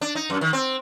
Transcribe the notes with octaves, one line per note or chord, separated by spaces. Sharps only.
D4
D#4
F#2
D#3
C4